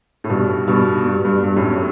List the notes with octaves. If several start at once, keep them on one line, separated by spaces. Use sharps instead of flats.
A2
G2 B2
G2 B2
G2
G2
G2
F#2 A2